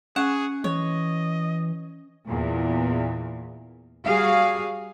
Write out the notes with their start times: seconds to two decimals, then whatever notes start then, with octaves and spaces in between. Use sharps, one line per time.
0.16 C#4 G#4 F#5
0.64 E3 C#5 D#5
2.28 E2 A#2
4.07 G3 F#4 G#4 F5